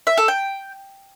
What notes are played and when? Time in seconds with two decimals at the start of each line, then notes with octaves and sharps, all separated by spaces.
0.07 E5
0.17 A4
0.28 G5